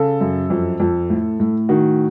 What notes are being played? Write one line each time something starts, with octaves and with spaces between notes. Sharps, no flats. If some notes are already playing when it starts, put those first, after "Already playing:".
Already playing: C#3 A4
F#2
F2
F2
A2
A2
D#3 F#4